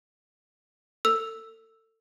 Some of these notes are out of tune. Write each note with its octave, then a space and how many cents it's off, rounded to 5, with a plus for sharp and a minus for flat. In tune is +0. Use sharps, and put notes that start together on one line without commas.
A4 +30 E6 +0